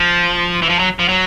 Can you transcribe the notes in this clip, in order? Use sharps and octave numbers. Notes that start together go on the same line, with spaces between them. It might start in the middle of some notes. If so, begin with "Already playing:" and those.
Already playing: F3
E3
F3
F#3
F3
F#3